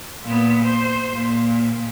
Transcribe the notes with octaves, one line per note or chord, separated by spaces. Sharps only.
A#2 B3
C5
A#2